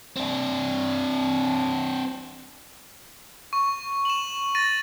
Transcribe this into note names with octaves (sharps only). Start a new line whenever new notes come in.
C4 D4
C#6
E7 F#7
A6 A#6 D#7